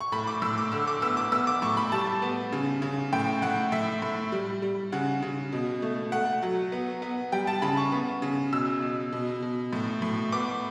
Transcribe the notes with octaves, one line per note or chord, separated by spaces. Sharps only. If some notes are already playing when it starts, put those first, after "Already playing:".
C#6
A2 B5
D6
A2 E6
D6
D3 E6
D6
B3 E6
D6
B3 E6
D6
A2 C#6
B5
G3 A5
B3
C#3
C#3
A2 G5
A2 F#5
A2 E5
A2
G3
G3
C#3 F#5
C#3
B2
A3
A3 F#5
F#3
B3
B3
G3 G5
A5
C#3 B5
C#6
B3
C#3
B2 E6
B2
B2
B2
A2
A2
B3 D6